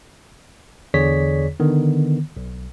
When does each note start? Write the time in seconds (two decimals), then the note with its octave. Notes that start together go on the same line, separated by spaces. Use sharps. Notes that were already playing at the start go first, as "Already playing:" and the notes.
0.94 E2 D3 G#4 C#5 D5 B6
1.60 D3 D#3 B3
2.37 B1